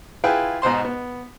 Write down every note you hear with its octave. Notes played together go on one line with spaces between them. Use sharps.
E4 F4 G#4 B4 G5
G#2 B2 C5 C6
B3